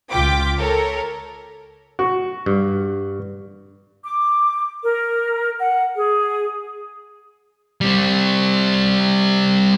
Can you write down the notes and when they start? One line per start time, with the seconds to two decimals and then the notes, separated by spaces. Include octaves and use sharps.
0.11 C#2 F4 G5 D6 B6
0.60 A4 A#4 C#5
1.99 F#4
2.46 G2
4.03 D6
4.84 A#4
5.60 F#5
5.95 G#4
7.81 G3 C4